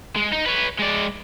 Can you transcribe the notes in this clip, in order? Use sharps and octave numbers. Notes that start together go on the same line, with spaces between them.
G#3
D#4
B4 C#5
G#3 D5